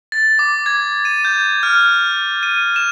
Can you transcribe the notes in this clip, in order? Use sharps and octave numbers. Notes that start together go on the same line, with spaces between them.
A6
D6
G#6
D#7
G6
F6
D#7
E7